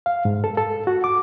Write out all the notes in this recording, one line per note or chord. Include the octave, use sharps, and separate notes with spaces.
F5
G#2
A4
A4
F#4
D6